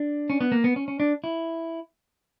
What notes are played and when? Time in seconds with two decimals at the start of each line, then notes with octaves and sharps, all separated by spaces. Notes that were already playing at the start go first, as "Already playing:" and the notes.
Already playing: D4
0.30 C#4
0.41 B3
0.52 A#3
0.64 B3
0.76 C#4
0.88 C#4
1.00 D4
1.24 E4